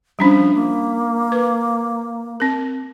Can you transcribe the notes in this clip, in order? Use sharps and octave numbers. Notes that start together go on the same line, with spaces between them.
F3 G3 C#4 D4
A#3
B4
C4 A#4